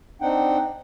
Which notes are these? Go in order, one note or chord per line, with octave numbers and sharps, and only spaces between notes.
C4 D4 D#4 F#5 G5